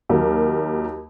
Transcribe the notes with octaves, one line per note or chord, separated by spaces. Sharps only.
D#2 F#3 A#4